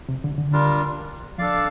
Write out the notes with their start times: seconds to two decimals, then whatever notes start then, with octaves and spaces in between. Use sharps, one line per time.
0.09 C3
0.24 D3
0.38 D3
0.52 G3 D4 F4 A#4
1.38 F3 D4 A4 D5 F5